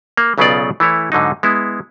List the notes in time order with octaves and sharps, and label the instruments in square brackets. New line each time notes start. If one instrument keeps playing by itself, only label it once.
[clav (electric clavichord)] A#3
B1 C#3 F#3 B3 F4 D5
E3 A3 E4 C#5
G#2 D3 F#3 D#4
G#3 B3 E4